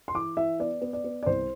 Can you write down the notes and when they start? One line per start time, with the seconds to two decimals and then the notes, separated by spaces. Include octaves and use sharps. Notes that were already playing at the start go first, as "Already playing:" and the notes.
0.08 C6
0.14 E3 D6
0.37 E3 E5
0.60 B3 D5
0.81 B3
0.93 D5
1.04 B3
1.23 D5
1.26 C2 C5